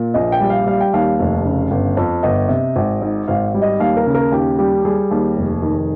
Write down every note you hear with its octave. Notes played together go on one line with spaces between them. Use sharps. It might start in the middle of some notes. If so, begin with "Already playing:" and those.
Already playing: A#2
A#1 D#5
G5
G3
F5
G3 F5
G5
D#2 F5
F1
C#3
G1
F2
G1 D#5
C3
G#1
G#2
G#1 F5
G3
D#5
D#2 F5
A#4
C#3
A#4
D#2 G4
G3 G4
G3 G#4
D#2
F1
D#3